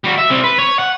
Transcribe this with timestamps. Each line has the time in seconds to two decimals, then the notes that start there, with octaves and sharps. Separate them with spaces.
0.04 G3 F#4
0.18 E5
0.30 G3 C4
0.44 B4
0.58 C#5
0.79 F#5